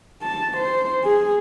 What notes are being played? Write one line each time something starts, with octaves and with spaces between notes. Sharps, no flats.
A5
C5
G#4